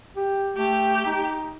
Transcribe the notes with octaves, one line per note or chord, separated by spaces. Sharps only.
G4
A3 G4
D#4